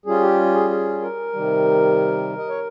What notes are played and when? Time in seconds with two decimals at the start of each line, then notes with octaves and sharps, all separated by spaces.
0.06 G3 C#4 F4 G#4
0.22 G4
0.54 G#4
0.70 G#4
1.02 A#4
1.33 C3 D#3 G3
2.38 D#5
2.49 C#5